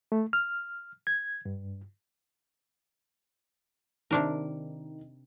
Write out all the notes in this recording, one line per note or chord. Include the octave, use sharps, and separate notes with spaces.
A3
F6
G#6
G2
C3 D#3 D4 A#4